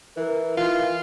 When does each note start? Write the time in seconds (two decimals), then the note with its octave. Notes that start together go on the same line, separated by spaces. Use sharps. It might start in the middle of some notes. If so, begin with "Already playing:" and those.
0.17 E3 A#4
0.57 E3 F4